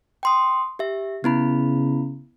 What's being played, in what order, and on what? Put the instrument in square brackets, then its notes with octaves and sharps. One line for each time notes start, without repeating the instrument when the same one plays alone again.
[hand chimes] G5 C6 D#6
G4 E5
[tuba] C#3 [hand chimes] B3 E4 B5